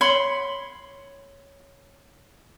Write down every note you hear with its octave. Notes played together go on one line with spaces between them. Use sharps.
C#5 B5 C6